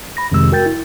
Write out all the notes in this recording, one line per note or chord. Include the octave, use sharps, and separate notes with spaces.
B5 A#6
F2 C3 D#3 G#3 E6
F#4 A#4 G5 G6 A6
E4